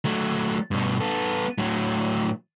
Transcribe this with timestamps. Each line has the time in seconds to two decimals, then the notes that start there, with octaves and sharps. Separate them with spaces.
0.05 F#3 A3
0.71 G2 B2
1.00 B3 A4
1.58 A2 F#3